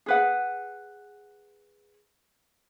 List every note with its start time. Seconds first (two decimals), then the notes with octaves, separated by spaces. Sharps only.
0.06 G#4 B4 F#5